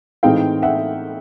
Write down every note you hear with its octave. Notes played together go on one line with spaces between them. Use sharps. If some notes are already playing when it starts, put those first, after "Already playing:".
A2 E3 G#3 C4 D#4 F5 G5
E5 F#5